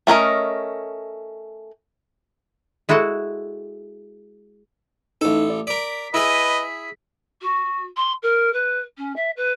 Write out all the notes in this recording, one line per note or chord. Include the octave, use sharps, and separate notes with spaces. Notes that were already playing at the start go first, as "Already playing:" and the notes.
A3 C#4 A#4 D#5
G#3 E4 F#4 A4 F#5
A1 D#4 A4
D5
A#4 D5 B6
E4 G#4 B4 D#5
F#4
C6
A#4
B4
C#4
E5
B4